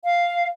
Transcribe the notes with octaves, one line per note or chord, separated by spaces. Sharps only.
F5